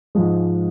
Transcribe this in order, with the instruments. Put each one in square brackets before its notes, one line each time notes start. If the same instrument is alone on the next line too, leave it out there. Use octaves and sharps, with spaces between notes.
[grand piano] G#2 F3 G#3